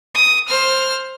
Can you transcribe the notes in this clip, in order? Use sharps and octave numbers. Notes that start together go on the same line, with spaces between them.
D#6
C5 F6